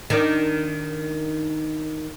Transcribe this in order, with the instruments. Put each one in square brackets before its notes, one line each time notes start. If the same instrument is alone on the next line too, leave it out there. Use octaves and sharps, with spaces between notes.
[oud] D#3 D4